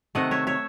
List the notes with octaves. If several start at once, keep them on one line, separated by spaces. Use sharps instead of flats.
C3 D#3 A3 D#5 F#5
C#5 E5
C#5 E5